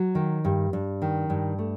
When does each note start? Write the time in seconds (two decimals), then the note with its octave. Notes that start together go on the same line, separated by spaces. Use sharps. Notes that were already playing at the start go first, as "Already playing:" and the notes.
Already playing: F#3
0.15 D#3
0.45 G2
0.73 G2
1.02 D#3
1.30 G2
1.58 A3